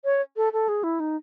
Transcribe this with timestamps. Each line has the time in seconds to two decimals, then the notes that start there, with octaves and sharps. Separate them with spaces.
0.05 C#5
0.37 A4
0.53 A4
0.69 G#4
0.84 E4
1.00 D#4